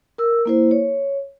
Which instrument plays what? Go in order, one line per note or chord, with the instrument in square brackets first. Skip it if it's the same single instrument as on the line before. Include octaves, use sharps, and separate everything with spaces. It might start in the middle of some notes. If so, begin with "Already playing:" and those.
[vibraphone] A#4 E6
A#3 E4 C5
C#5